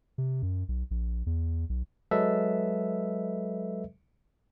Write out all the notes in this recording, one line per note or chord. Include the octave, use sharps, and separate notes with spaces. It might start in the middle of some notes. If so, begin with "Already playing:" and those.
C3
F#2
B1
A#1
E2
B1
F#3 G#3 A4 B4 D#5 E5